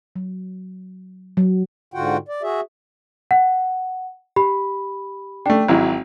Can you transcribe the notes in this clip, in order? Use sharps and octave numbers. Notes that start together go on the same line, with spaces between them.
F#3
F#3
G#2 D3 F4 F#4 F#5 G5
D5
F#4 G#4 E5
F#5
G4 B5
A3 D4 G5
G#1 F#3 E4